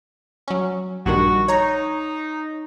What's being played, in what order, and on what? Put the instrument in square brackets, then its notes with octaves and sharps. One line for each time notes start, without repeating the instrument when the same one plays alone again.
[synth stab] F#3 C#4
[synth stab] A#1 G2 D#3 [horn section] F#4
[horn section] D#4 [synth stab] C#5 A#5